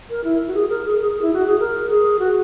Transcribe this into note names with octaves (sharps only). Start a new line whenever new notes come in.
A#4
E4
F#4
G#4
A#4
G#4
G#4
E4
F#4
G#4
A#4
G#4
F#4